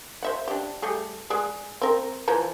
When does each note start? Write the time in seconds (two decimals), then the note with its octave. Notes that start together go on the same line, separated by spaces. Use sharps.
0.23 C5 E5 F#5
0.48 D4 G4
0.82 G3 A3 G#4
1.30 G#3 G#4 D5
1.82 C4 A#4
2.28 E3 F3 A#5